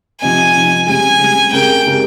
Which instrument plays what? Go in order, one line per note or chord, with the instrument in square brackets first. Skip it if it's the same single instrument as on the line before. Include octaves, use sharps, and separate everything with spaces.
[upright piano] C3 F3 C4 D#4 [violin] G#5
[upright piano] C3 F3 C4 D#4
[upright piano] C#3 G3 C4 [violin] G#5
[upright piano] C#3 G3 C4
[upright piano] C#3 G#3 C4 G4 A#4 [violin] G5
[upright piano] C#3 G#3 C4 G4 A#4